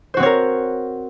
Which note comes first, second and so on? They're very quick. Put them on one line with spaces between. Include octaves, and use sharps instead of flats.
C5 F#4 C4 C#5 A#4